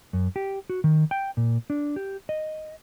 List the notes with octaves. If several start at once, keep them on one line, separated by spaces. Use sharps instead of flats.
F#2
G4
F#4
D#3
G5
A#2
D4
G4
D#5